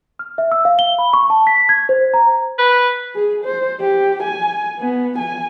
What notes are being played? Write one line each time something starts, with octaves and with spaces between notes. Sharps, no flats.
F6
E5
E6
F5
G7
B5
C#6
A5
B6
G#6
C5
A#5
B4
G#4
C5
G4
G#5
B3
G#5